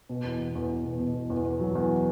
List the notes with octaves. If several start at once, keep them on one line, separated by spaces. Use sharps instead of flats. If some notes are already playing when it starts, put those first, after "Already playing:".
B2
E2
B2
E2
E2
B2
B2
E2
E2
E2
F#3
E2